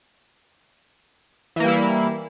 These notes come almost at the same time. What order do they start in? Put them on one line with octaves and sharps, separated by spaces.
E3 A#3 G3 E4